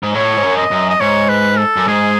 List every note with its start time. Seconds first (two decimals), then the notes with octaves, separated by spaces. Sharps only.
0.03 G#2
0.14 A2 C#5
0.37 G#2
0.43 F#2
0.57 D#5
0.71 F#2
0.89 D#5
1.00 G#2 C#5
1.29 B4
1.58 A4
1.76 F#2
1.87 G#2 G#4